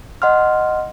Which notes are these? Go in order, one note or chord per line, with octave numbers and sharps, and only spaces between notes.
D#5 F#5 C6 F6